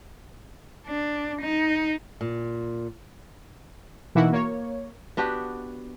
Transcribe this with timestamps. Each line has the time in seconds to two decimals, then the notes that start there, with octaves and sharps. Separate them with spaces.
0.87 D4
1.41 D#4
2.21 A#2
4.15 B2 E3 A#3 D#4 E4 F#4
4.32 A#3 C#5
5.17 B3 D4 F#4 G4